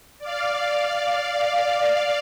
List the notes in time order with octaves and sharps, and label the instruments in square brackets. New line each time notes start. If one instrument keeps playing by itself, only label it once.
[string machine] D5 F5